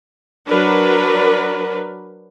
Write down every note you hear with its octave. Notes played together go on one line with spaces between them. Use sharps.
F#3 D4 A#4 B4